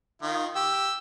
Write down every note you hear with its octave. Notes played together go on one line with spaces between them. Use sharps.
D#3 F4
G4 E6